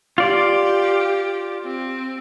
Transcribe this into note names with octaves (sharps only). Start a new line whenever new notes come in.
F4 G4 D5
C4